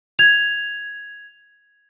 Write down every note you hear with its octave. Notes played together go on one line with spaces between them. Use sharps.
G#6 F7